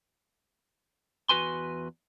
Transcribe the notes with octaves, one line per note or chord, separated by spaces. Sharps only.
E2 F#4 B4 G#5 C6